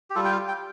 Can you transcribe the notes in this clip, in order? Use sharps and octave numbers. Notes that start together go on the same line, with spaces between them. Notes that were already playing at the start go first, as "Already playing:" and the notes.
G4
G3 F4 A4
G5
F5
G5